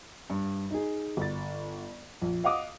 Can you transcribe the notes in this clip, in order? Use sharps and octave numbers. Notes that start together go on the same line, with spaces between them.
G2
D#4 G#4
G1 A6
A#1
D#5 F5 F#5 D6 D#6